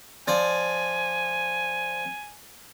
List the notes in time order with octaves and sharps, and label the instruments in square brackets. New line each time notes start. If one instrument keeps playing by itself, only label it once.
[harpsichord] F3 D5 [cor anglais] G#5